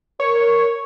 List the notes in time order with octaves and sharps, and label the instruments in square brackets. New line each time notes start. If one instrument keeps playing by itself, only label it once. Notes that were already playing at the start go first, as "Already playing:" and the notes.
[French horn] A#4 [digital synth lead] C#5